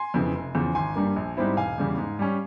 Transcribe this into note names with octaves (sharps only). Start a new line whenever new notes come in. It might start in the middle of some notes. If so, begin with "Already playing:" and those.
Already playing: G#5 C6
F2 C#3 E3
F1
E2 C#3 F3
G#1 G#5 C6
G2 G3 A#3
A#1
G#2 G3 C4 E4
E1 F5 G#5
E2 C#3 G3
G#2
G3 C#4